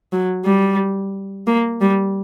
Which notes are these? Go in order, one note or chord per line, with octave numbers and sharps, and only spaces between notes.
F#3
G3
A#3
G3